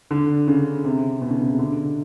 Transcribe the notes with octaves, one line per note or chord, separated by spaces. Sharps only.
D3
C#3
C3
B2
C#3
C#3
C3
D3